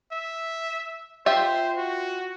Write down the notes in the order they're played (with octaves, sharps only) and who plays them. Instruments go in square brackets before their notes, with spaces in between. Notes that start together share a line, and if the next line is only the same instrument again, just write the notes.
[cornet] E5
[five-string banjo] F4 G4 E5 [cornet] C5
[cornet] F#4